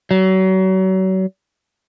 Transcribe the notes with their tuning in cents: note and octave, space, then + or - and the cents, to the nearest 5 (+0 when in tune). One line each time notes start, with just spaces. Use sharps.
F#3 +35